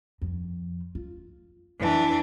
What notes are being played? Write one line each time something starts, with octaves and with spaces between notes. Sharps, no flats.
F2
F4
F2 E3 D4